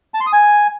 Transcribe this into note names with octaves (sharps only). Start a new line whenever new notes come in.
A5
C6
D#6
G#5